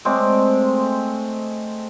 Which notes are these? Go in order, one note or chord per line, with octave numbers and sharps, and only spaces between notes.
G#3 A3 C4 D5